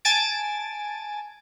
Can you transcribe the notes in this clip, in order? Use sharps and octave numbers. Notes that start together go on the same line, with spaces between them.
G#5 A5 A6 D7